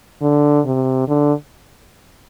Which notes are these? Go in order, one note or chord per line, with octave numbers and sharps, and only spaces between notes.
D3
C3
D3